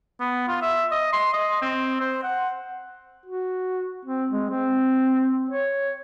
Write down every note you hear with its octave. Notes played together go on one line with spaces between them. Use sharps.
B3
F4
E5
D#5
C6
D#5
C4
C5
F#5
F#4
C4
G#3
C4
C#5